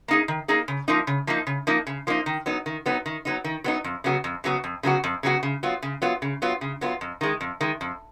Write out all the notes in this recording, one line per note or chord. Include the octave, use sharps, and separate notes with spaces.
A#3 D#4 G#4
D#3
A#3 D#4 G#4
C#3
F3 A#3 D#4
C#3
F3 A#3 D#4
C#3
F3 A#3 D#4
C#3
F3 A#3 D#4
D#3
F#3 B3 D#4
D#3
F#3 B3 D#4
D#3
F#3 B3 D#4
D#3
F#3 B3 D#4
F2
C#3 F#3 B3 F#4
F2
C#3 F#3 B3 F#4
F2
C#3 F#3 B3 F#4
F2
C#3 F#3 B3 F#4
C#3
F#3 B3 F4
C#3
F#3 B3 F4
C#3
F#3 B3 F4
C#3
F#3 B3 F4
F2
D#3 G#3
F2
D#3 G#3
F2